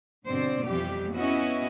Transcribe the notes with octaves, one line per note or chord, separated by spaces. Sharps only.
G2 B2 D3 C4 C5 D5
F2 E3 G3 G4
B3 C#4 E4 F#4 D#5